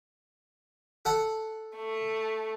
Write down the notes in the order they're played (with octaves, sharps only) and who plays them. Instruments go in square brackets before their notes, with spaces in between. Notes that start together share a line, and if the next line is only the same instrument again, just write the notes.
[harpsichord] A4 F#5
[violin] A3